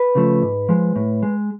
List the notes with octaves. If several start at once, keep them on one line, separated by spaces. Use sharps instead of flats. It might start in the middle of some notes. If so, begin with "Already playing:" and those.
Already playing: B4
C#3 F3 A3
G#2
F3 G#3
A2
G#3